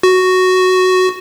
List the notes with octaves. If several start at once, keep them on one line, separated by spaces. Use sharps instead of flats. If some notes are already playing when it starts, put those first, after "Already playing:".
F#4